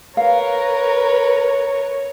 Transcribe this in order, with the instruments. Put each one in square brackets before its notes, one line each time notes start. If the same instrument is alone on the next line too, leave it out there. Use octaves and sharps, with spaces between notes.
[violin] A#4 B4 [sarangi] C#5 [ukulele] F5